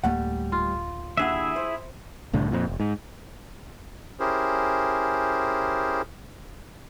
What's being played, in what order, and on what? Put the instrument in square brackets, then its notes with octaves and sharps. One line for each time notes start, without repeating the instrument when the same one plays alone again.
[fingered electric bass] D1 A#3 [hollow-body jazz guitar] G3 A3 F#5
[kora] F4
[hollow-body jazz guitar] D#2 D4 F#5 [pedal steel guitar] E4 G#4 E5
[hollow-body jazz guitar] C5
[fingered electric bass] C2 A2 D3
F2 A#2
F1
G#2
[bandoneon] C#4 E4 G4 G#4 A#4 C5